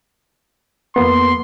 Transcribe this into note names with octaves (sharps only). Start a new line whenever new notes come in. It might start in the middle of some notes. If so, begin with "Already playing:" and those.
F2 A#3 B3 C6